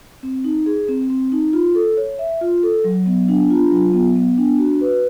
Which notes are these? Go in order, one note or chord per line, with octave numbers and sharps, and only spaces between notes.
C4
D#4
G#4
C4
C4
D#4
F4
A4
C#5
E5
F4
A4
F#3
B3
D4
F4
F#3
B3
B3
D4
F#4
B4